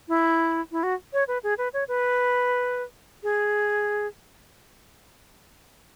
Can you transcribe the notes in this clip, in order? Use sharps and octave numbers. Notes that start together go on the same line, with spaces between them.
E4
E4
F#4
C#5
B4
G#4
B4
C#5
B4
G#4